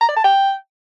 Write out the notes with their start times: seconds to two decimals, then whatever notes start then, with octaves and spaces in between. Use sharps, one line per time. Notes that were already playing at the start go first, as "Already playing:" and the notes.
0.01 A#5
0.09 D5
0.16 A5
0.24 G5